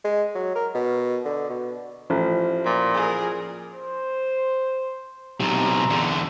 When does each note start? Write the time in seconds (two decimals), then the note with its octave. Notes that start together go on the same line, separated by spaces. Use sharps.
0.04 G#3
0.35 F#3
0.55 A#4
0.75 B2
1.25 D3
1.50 B2
2.10 A1 F3
2.66 A#2
2.95 G#4 A#4
3.73 C5
5.40 B1 C3 A#5
5.90 E2 D3